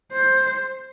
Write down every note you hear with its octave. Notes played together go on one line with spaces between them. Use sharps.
C5